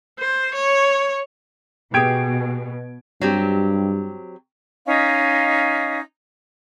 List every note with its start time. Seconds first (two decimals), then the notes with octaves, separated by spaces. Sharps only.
0.19 C5
0.54 C#5
1.94 B2 G4 G#4 G#6 D7
3.21 G2 F#3 C4 G4
4.85 C#4 D#4 D#5 F5